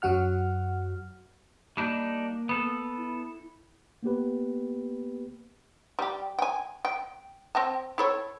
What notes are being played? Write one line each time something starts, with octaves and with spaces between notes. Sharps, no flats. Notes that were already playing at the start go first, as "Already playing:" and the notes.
F#2 F#3 F#4 F#5 F6
G3 A#3 D4 D#4
B3 A4
E4
A#3 B3 G4 B4
G3 G4
G5 G#5
G5
C4 G5 A5
E4 A4 C#5